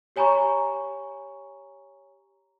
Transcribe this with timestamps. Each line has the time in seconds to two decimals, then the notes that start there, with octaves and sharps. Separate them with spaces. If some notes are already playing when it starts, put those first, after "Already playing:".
0.16 G4 C#5 G#5 A#5 B5 C#6